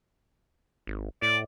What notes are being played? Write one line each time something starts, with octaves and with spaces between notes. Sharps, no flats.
G#1
A2 D5